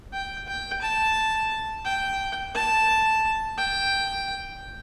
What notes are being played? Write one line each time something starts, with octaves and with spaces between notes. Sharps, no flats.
G5
G5
A5
G5
A5
G5